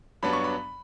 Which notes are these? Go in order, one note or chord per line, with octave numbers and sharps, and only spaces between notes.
G2 F#3 B3 D4 B5
C#6
B5